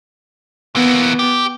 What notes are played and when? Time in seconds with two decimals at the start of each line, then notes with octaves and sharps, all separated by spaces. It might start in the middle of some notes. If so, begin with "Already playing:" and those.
0.76 E3 A#3 B3
1.19 G4